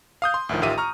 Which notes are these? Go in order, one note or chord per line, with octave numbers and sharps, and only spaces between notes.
F5 D#6 G6
C6
D2 A2 D#3 F3
A1 D#3 F4 G4 E5 D#7
A#5 C#6 F6